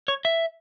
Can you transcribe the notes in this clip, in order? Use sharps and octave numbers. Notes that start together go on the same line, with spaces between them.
C#5
E5